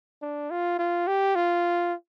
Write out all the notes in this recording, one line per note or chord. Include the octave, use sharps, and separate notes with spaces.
D4
F4
F4
G4
F4